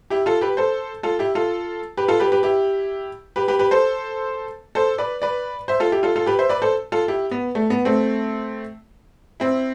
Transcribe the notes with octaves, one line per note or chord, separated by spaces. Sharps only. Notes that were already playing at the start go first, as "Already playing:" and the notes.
E4 G4
F4 A4
G4 B4
A4 C5
F4 A4
E4 G4
F4 A4
G4 B4
F4 A4
G4 B4
G4 B4
E4 G4
G4 B4
G4 B4
G4 B4
A4 C5
A4 C5
B4 D5
B4 D5
C5 E5
F4 A4
E4 G4
F4 A4
F4 A4
G4 B4
C5 E5
B4 D5
A4 C5
F4 A4
E4 G4
B3
A3
B3
A3 C4
C4 E4